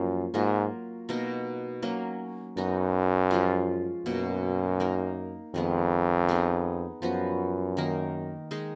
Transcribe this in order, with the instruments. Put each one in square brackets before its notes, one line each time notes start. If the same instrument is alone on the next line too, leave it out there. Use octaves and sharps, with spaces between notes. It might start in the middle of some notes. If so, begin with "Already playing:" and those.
Already playing: [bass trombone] F#2 [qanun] F3 A#3 C#4
[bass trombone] G#2 [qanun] F#3 A#3 F4 A#4
[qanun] B2 A#3 D#4 A#4
F#3 A#3 C#4
[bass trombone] F#2 [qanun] B3 D#4 F#4
[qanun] F3 G#3 C#4 F4
[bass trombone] F#2 [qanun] B2 A#3 D#4
[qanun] A#3 D#4 A#4
[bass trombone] F2 [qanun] D#3 G#3 B3
[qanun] B3 D#4 G#4
[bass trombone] F#2 [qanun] F3 B3 F#4
[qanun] D#3 A#3 D#4 A#4
D#3 G#3 D#4 G#4